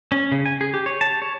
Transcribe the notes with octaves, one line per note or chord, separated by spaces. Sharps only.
C#4
C#3
G#5
G#4
G4
C#5
A5
C#5